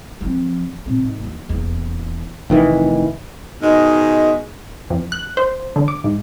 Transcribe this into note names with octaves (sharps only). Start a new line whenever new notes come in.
F3 C4
A#2 C4
G#2
D#2 F#3
D#1 E2
F1 D#3 E3
G#2 B2 D#3 G#3
F2
F#6
C5
D3
D6
G#2